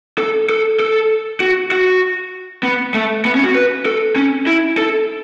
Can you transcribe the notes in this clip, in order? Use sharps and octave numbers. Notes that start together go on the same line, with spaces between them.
A4
A4
A4
F#4
F#4
B3
A3
B3
C#4
F#4
B4
A4
C#4
E4
A4